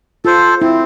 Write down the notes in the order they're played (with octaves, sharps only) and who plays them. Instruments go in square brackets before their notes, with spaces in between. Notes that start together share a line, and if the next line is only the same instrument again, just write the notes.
[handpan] F4 [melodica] A4 C5
[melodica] C4 [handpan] E4